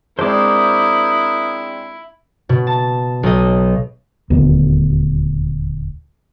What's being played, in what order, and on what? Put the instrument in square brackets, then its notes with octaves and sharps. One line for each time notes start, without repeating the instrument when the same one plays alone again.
[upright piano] G#3 C4 D4 [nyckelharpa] E4 [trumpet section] A#4 D#6 [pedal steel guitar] C5 D6
[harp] B2
A5
B1 D#5
[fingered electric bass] D#1 D2 B3